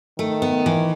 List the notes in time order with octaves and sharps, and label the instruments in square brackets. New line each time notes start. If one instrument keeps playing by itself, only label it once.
[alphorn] D#3 [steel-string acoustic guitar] A3
[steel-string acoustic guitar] B3
E3